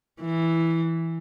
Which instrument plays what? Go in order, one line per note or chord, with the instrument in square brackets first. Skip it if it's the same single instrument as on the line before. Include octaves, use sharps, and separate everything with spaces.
[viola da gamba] E3